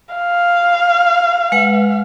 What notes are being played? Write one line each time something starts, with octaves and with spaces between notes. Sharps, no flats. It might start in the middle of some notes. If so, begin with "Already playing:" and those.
F5
G#3 B4 F#5